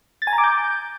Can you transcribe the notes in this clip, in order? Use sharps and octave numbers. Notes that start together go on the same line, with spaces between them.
A6
G#5
A#5
D6
G6